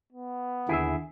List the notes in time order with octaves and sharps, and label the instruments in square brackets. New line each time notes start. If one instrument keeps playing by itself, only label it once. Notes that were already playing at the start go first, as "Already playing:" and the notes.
[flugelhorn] B3
[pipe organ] D#2 D3 [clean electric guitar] E4 G#4 E5